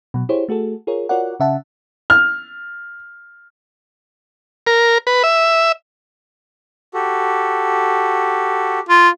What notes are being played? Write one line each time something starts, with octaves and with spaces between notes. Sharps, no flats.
B2 F#3
E4 G4 G#4 C5 C#5
A3 F#4 G#4 A4
F4 G#4 A#4 C#5
F4 F#4 A#4 C#5 D5 F#5
C#3 C#4 E5 F#5 A5
F6
A#4
B4
E5
F#4 G4 A4
F4